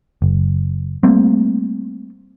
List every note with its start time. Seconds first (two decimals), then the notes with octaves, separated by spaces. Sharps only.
0.22 F#1
1.03 G3 A3 A#3 C4